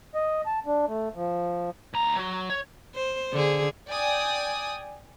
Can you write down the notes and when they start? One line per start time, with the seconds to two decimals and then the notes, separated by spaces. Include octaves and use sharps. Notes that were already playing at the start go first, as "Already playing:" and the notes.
0.15 D#5
0.46 A5
0.66 D4
0.87 A3
1.15 F3
1.94 D2 A#5
2.17 F#3 F#4
2.50 C#5
2.95 C5
3.33 D3 G#4
3.88 D5 G5 G#5 D#6